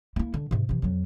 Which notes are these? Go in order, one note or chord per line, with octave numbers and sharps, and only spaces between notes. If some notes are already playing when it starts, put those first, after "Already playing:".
A#3 E4
D3
G#2 C3
C3 E3
F2 F#3